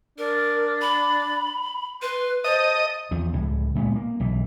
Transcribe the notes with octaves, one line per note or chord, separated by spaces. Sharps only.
D4 A#4
B5
B4 C6
C5 D#5 A5 D#6
E2 F3
C#2 A2
A#2 G#3 B3
A#3
B1 E3